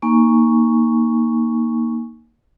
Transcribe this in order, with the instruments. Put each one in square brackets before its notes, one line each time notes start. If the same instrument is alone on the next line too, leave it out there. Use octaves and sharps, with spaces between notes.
[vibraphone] A#3 D#4 G#5 C#6